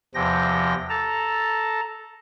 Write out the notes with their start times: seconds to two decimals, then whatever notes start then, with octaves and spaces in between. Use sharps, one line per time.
0.15 E2 C3 F3 G5 A#6
0.89 A4 A5 A#5